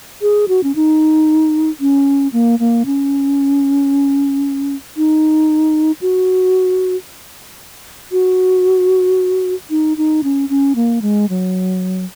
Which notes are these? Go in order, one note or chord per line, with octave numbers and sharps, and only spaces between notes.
G#4
F#4
C#4
D#4
C#4
A#3
A#3
C#4
D#4
F#4
F#4
D#4
D#4
C#4
C#4
A#3
G#3
F#3